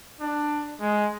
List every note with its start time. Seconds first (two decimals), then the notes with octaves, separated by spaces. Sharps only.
0.20 D4
0.80 G#3